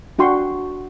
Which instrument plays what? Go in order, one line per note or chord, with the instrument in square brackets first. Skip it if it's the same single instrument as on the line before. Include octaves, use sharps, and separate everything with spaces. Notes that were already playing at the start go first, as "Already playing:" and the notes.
[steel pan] D4 F#4 G5 C6 C#6